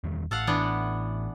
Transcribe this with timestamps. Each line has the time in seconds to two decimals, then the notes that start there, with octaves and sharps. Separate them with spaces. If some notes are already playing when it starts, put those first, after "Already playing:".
0.04 E2 D#3 G3
0.31 A1 A4 F5 F#5
0.47 E3 B3 D4